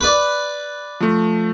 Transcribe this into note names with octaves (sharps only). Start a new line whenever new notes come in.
B4 D5
F3 A3